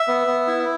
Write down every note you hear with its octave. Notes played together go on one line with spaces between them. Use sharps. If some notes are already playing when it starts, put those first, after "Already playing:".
Already playing: E5
B3
B3
E4